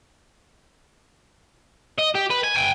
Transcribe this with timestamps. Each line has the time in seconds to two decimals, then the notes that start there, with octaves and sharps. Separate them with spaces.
1.99 D#5
2.15 G4
2.31 B4
2.44 G#5
2.56 G5 G#5